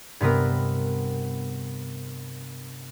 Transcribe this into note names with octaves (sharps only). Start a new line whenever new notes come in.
G2 C3 B3 A#4